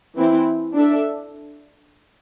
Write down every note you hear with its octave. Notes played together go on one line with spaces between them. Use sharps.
E3 C4 E4
D4 A4 E5